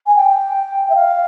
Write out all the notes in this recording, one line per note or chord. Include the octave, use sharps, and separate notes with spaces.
G#5
G5
E5
F5